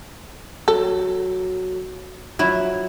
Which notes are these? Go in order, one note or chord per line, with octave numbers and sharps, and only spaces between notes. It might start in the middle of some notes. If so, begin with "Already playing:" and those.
F#3 A4
F3 F#3 E4